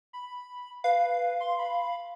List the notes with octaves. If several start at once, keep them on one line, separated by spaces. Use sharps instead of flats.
B5
B4 F5
C6
B5